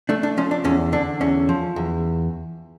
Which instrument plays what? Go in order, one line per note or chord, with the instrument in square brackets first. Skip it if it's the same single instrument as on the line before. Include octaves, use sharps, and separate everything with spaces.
[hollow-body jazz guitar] A3 D4
D4
F3 C#4
D4
E2 C#4
D3 D4
E2 C#4
F3
E2